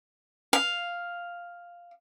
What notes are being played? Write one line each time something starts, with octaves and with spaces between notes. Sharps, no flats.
F5